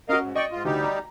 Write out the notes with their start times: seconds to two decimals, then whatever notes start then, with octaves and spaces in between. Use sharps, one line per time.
0.09 C#4 F#4 A#4 D#5 F5
0.22 G#2
0.35 D5 D#5 G5 C#6
0.52 G#2 F4
0.65 D2 G3 D#4 G4
0.84 A#5